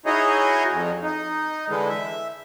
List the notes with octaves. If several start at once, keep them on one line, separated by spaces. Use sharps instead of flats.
D#4 E4 F#4 G#4 C#5 D#5
F2
D#4
D3 E3 G#3
E5